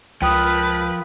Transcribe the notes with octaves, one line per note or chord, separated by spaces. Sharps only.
C#2 F3 A#4 B4 G5 D#6